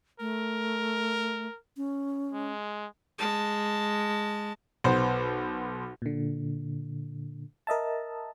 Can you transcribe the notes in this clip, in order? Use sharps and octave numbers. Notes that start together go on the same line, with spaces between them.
A3 A#4
C#4
G#3
G#3 A5
B1 B3 C5
A#2 D3
A#4 D#5 E5 A5